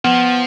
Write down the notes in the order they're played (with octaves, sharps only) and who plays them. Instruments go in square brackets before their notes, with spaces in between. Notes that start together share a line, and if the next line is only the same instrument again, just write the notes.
[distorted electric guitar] F3 [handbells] B3